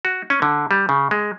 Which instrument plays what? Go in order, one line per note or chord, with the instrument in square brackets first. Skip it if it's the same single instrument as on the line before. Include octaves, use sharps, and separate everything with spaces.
[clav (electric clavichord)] F#4
C#4
D3
G3
C#3
G#3